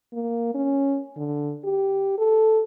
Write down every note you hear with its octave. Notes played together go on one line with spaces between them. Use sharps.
A#3
C#4
D3
G4
A4